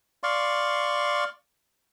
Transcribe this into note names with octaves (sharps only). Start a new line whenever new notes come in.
D5 F5 C6 C#6